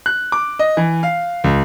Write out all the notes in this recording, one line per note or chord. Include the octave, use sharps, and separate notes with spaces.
F#6
D6
D#5
E3
F5
C#2